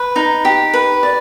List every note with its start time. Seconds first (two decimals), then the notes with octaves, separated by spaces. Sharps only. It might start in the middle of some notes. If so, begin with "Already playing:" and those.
Already playing: B4
0.16 D#4
0.45 G4
0.74 B4
1.03 D5